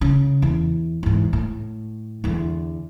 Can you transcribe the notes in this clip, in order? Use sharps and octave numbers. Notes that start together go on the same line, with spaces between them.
C#3
E2
E2 G#2
A2
E2 D3